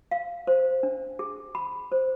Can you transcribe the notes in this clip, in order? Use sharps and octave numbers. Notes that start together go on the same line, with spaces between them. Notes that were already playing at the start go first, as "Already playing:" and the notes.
F5
C5
D4
G#4
B5
C5